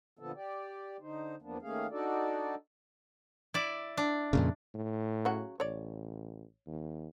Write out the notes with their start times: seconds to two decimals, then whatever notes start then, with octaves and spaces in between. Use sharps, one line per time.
0.19 A#2 D3 F3 B3 A4
0.35 G4 D5
1.00 D3 D#4 C5
1.42 E2 F3 A#3 B3 D4
1.62 D#3 A3 A#3 C#4 G#4 F5
1.91 D4 D#4 F#4 A4 D5
3.54 E4 D5
3.97 D4
4.33 F2 A#2 C#3
4.75 A2
5.25 C#3 F#3 F#4
5.60 A1 C#5 D5
6.67 D#2